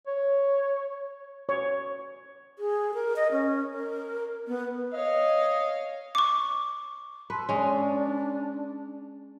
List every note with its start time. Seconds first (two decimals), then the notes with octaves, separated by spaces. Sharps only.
0.07 C#5
1.49 C#5
2.59 G#4
2.94 A#4
3.16 D#5
3.32 C#4
3.74 A#4
4.48 B3
4.94 C#5 D#5 F5
6.15 C#6 D6
7.30 B4 A5 C6 E6
7.49 G#3 C#4 D4